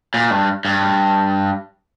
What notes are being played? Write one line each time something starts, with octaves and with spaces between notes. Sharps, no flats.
A#2
G2
G2